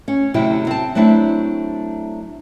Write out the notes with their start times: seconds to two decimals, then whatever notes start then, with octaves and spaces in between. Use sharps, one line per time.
0.08 C#4
0.34 D2 C3 F#3 E4 F#4 G5
0.67 C4 A5
0.95 F#3 A3 C4 D4 E4